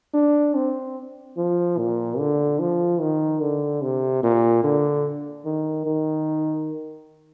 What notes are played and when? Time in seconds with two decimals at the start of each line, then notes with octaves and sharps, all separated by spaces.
0.14 D4
0.55 C4
1.37 F3
1.78 A#2
2.19 D3
2.59 F3
3.01 D#3
3.41 D3
3.82 C3
4.23 A#2
4.64 D3
5.45 D#3
5.86 D#3